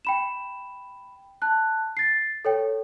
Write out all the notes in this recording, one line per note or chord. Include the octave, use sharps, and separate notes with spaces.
G5 B5 E7
A5 F#6
A6 C7
A4 C#5 G5